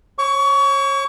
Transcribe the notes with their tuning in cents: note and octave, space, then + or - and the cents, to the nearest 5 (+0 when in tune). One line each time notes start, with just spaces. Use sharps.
C#5 -30 C#6 +30